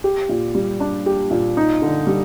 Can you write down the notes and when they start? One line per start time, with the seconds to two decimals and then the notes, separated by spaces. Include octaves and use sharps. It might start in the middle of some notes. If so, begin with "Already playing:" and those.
0.04 G4
0.29 A#2
0.55 G3
0.80 D4
1.06 G4
1.31 A#2
1.57 D#4
1.82 D3
2.07 G3